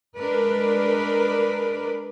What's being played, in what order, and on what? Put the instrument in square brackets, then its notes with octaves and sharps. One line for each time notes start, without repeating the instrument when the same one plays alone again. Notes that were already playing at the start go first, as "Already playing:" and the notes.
[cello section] G#3 D4 A#4 B4 D5